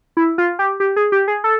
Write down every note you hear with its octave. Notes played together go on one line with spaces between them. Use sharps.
E4
F4
G4
G4
G#4
G4
G#4
A4